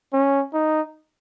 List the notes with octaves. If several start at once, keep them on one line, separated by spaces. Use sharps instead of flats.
C#4
D#4